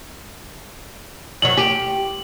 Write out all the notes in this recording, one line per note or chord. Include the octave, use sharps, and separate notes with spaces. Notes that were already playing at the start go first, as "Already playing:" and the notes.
F#2 F#3 F#7
G4